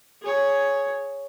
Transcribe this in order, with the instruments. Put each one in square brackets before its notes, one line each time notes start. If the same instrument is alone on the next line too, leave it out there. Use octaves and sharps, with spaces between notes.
[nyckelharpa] G#4 C#5